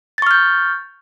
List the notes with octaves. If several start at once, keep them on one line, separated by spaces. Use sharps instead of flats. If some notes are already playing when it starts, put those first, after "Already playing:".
C#6 F6 G6 A6